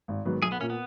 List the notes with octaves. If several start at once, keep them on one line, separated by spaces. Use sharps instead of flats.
G#1
G#2 D#3 F#3 B3
B1 G#4
B3
A#2 A#3 C#4
B3